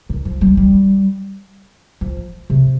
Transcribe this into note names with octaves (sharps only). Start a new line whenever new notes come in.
D#3
F3
G3
G3
F3
C3